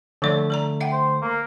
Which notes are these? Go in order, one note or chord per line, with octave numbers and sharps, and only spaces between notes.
D3 F3 A3 D5
A4 D5 A#5
E5 F#5 G5
C5
A#3